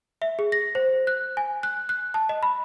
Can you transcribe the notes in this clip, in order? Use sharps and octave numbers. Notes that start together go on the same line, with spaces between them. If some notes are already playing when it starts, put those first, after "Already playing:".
E5
G#4
A#6
C5
F#6
G#5
F#6
F#6
A5
D#5
B5